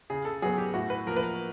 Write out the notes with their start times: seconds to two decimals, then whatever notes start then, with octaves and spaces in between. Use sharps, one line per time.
0.10 C#3 G#4
0.25 A4
0.42 F#3 B3 G#4
0.58 G4
0.74 A2 F#4
0.90 B4
1.07 F3 A#3 A#4
1.17 B4
1.23 A#4